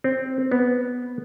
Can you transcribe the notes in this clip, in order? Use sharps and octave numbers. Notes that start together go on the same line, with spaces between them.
C4
B3